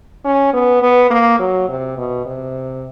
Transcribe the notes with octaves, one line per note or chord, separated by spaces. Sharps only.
C#4
B3
B3
A#3
F#3
C3
B2
C3